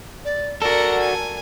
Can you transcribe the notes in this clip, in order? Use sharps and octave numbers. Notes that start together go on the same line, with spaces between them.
D5
F#4 A4 A#4 D5 F#5
G#5